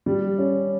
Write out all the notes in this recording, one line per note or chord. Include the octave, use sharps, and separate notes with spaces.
G3
C#4